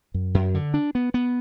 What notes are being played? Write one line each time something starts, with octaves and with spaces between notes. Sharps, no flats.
F#2
F#2
D3
D4
B3
B3